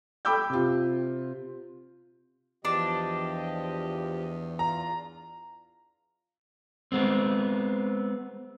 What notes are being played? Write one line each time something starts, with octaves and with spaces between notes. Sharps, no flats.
A4 G5 B5 D6 E6 G6
C3 F4
E2 F3 D4 G4 D#5
F4 A#5
G#3 B3 C4